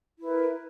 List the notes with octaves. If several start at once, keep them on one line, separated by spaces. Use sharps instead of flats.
E4 A#4 B4